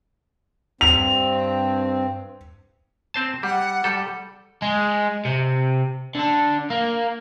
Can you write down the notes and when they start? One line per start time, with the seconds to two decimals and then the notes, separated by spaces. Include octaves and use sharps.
0.81 G2 C4 F7
3.14 C4 C5 A5
3.43 G3 F#5
3.84 G3 A4
4.62 G#3
5.25 C3
6.15 D3 D4
6.70 A#3